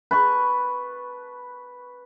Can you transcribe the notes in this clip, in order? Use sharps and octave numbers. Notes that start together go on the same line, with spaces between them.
B4 A5 C#6